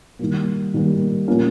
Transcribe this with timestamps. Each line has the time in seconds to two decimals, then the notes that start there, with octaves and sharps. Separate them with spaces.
0.19 D#3 G3 A#3
0.74 D#3 G3 A#3
1.28 A#2 F3 A#3 C#4